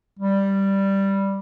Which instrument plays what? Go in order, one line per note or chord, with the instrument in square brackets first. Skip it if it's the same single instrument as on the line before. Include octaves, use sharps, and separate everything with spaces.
[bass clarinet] G3